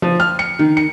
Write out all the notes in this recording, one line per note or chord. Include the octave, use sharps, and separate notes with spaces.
F3
F6
C#7
D#3
C#7